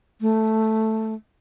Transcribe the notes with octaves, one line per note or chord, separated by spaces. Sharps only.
A3